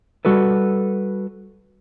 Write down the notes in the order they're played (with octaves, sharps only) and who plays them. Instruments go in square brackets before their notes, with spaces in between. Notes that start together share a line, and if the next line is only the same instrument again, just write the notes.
[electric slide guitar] G3 F#4 A4 B4